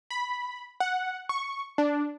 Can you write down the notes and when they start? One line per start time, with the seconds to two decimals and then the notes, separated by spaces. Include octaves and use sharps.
0.11 B5
0.80 F#5
1.29 C#6
1.78 D4